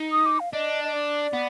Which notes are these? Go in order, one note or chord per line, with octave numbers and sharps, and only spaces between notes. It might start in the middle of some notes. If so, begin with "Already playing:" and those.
Already playing: D#4
D#6
D6
F5
D4 D#5
D#5
D5
B3